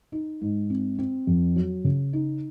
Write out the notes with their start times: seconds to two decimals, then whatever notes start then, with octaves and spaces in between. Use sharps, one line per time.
0.12 D#4
0.41 G#2
0.70 C4
0.99 C4
1.27 F2
1.56 F#3
1.84 C#3
2.13 D#4